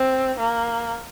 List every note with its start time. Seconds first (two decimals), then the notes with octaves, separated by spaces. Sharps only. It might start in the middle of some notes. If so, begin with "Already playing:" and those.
Already playing: C4
0.39 A#3